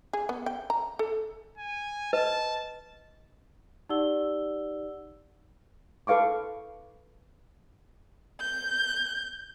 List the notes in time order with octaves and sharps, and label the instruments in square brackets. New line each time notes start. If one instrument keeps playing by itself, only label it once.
[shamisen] G#4
B3
G5
A#5
A4
[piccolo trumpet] G#5
[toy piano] B4 D#5 [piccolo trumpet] A5
[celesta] D#4 G4 D5 F#5 E6 G7
[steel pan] A4 B4 F5 C#6 D6
[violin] G6